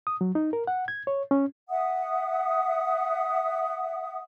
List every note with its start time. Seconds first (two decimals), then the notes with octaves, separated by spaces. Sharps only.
0.07 D#6
0.21 F#3
0.35 D#4
0.53 A#4
0.67 F#5
0.88 G#6
1.07 C#5
1.31 C#4
1.70 E5 F#5 D#6